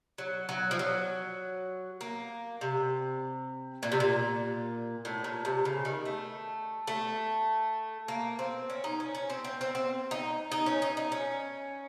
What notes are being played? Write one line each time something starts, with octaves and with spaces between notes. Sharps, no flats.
F#3
F#3
F3
F#3
A#3
C3
A#2
C3
A#2
A2
A#2
C3
C#3
D#3
A3
A3
A#3
C4
C#4
D#4
C#4
C#4
C4
C4
C4
C4
D#4
D#4
C#4
D#4
D#4
C#4